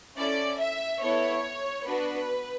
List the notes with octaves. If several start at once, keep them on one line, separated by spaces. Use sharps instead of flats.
C#4 E4 A4 D5
E5
B3 E4 A4 C#5
B3 D4 F#4 B4